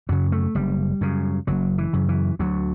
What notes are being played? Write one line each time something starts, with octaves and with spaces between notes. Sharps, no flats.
F#2 C#3 F#3
A3
F#1 G3
F#2 C#3
F#1 F#3
E3
F#2 C#3
E3
D2 F#3